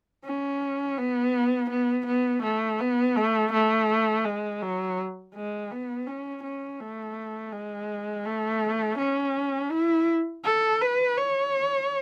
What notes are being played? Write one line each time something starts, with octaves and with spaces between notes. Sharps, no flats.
C#4
B3
B3
B3
A3
B3
A3
A3
G#3
F#3
G#3
B3
C#4
C#4
A3
G#3
A3
C#4
E4
A4
B4
C#5